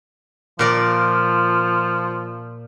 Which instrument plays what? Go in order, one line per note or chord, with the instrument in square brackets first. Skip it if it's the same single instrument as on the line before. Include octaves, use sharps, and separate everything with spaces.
[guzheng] A#2 A#4 D5 [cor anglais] F3